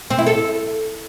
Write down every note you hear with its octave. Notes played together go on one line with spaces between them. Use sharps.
C4
E4
A4